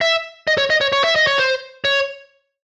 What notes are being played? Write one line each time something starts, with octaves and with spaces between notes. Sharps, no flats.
E5
D#5
C#5
D#5
C#5
C#5
E5
D#5
C#5
C5
C#5